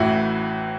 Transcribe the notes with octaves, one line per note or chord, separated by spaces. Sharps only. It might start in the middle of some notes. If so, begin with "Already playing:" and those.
Already playing: A1 A2 E3 E4 F#4